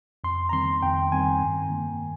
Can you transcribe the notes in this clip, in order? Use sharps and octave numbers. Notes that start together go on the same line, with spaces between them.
F2 C6
A#5
D#3 G3 C4 C6
F2 G5
D#3 G3 C4 G#5
G2
D#3 A#3